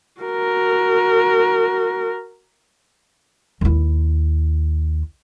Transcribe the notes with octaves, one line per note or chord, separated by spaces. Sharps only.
F#4 A#4
D#2 E4